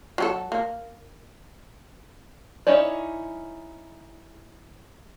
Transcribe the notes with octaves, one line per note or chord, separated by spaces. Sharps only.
F#3 G4 A4
A#3
C#4 D#4 E4 C#5 D5